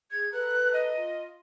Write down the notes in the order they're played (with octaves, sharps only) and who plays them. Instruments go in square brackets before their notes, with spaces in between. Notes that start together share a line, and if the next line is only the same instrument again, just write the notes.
[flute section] G#4 [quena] G#6
[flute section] A4 B4 A#5 [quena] F#6
[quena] D#5
[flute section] F4